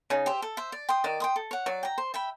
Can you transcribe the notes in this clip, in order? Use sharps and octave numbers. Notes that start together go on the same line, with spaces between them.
C#3 D#4
G4 C5 E5
A4
C5 E5
D5
G5 C6 D#6
D#3 D5
G5 C6 D#6
A4
C#5 F#5
F#3 D5
G5 A#5
C5
E5 G5 B5